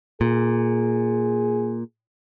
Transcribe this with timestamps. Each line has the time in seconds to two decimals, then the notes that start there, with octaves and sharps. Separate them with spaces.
0.21 A#2 G#4